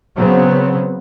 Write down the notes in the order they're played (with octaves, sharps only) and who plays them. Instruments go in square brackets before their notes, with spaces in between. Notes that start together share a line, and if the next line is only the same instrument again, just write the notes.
[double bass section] C#3 F#3 B3 C4